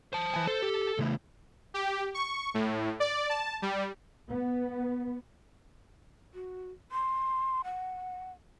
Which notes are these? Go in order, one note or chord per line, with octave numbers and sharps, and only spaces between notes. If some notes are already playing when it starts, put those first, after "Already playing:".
C5 A5
E3 G#5
A4 C5
G4
C#3 E3 A3
G4
C#6
A2
D5
A5
G3
B3
F#4
C6
F#5